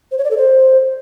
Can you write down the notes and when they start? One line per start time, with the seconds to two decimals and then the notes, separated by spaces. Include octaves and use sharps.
0.12 C5
0.18 C#5
0.24 D5
0.31 A4
0.37 C5